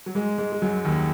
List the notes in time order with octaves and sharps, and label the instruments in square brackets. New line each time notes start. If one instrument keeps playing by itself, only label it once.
[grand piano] F#3
G#2 G#3
G#2 G#3
G#3
F#2 F#3
D#2 D#3